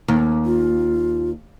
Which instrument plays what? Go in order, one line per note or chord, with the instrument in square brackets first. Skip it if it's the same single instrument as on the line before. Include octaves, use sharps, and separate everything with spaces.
[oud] D#2
[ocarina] F4